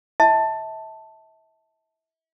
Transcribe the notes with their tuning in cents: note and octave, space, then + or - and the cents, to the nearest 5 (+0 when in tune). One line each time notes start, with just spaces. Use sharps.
E5 -35 A5 +5